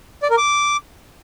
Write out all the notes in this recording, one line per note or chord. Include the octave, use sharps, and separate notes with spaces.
D5
A#4
D6